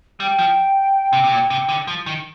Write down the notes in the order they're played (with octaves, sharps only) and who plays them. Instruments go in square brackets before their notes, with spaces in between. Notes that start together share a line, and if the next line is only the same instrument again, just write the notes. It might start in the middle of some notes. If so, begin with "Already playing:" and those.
[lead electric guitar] G3 [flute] G5
[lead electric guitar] F3
C3
C3
A#2
C3
D3
F3
D#3